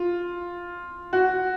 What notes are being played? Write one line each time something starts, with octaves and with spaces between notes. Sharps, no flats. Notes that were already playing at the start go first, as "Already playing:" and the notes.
Already playing: F4
F#4